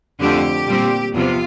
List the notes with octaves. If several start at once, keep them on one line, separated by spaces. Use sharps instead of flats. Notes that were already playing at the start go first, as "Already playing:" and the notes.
F2 D3 A3 C4 G4
A#2 G3 C4
E2 C3 F3 F4